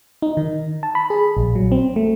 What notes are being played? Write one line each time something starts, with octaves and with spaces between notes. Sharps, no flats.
D#4
D#3
A5
B5
G#4
A#1
F#3
C4
A3